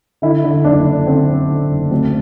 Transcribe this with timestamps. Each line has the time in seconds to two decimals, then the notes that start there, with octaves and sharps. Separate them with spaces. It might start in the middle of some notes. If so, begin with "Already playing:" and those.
0.22 D3 E4
0.44 D3
0.65 F#1 D4
0.86 F#1
1.07 D3 C4
1.28 F#1
1.50 D3
1.70 F#1
1.91 D2 C4